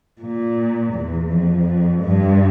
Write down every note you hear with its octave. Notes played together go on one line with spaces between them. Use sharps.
A#2
E2
F2
G2